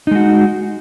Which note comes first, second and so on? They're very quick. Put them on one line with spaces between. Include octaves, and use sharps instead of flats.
D#4 G#3 F#4